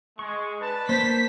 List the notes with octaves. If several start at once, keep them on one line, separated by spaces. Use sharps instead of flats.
G#3 C#6
D4 B4 A5
A#3 C5 G6 B6